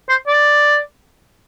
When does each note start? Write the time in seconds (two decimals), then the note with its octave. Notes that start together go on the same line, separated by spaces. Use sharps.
0.09 C5
0.27 D5